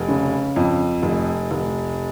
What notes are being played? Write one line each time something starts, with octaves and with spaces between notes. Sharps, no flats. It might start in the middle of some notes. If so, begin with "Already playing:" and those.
Already playing: F1
C#3
F2
F1
F1